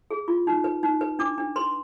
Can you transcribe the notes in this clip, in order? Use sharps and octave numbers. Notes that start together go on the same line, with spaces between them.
G#4
F4
D#4
B4
D#4
B4
D4 D6
D4
B4 C6